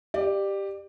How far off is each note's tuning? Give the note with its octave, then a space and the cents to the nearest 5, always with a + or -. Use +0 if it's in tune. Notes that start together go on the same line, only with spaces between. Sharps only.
G4 +0 D5 +30